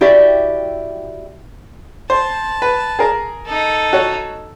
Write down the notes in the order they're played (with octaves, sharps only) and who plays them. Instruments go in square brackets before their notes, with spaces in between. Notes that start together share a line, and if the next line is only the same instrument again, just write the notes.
[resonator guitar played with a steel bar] E4 F#4 G4 D5 E5
[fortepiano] C5 [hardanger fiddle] A5
[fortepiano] B4
G#4 A#4
[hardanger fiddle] D#4 A4
[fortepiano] F#4 C#5